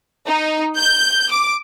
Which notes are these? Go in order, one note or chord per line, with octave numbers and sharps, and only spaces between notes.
D#4
G6
D6